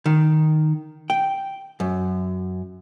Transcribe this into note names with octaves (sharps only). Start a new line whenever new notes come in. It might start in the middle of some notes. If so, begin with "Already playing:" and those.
D#3
G5
F#2